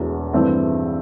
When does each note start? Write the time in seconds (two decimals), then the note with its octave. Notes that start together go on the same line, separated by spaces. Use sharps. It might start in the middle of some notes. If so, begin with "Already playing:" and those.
Already playing: E1 E2 B2 A3
0.33 G2 E3 A3 C4 E4